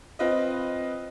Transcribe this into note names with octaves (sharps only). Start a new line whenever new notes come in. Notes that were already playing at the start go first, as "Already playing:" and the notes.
C4 F4 B4 D#5